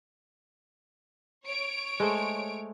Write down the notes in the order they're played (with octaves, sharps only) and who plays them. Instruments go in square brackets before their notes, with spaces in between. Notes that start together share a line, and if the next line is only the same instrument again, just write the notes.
[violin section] C#5 D7
[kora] G#3 A3 C5